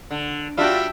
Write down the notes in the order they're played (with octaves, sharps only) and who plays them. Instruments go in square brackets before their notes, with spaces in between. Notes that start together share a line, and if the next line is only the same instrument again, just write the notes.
[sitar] D3
[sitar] G3 D4 [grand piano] F4 F#4 [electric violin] E5 G5